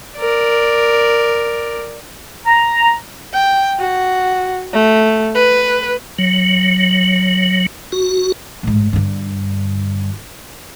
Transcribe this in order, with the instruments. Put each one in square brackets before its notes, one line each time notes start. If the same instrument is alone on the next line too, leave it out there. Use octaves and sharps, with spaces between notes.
[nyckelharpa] A#4 D5
[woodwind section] A#5
[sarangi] G5
F#4
A3
B4
[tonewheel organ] F#3
F#4
[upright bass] A1 G#2
G2 D3